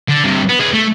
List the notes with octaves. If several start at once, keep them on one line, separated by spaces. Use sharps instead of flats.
D3
G2 C3
B3
G#4 B4
A3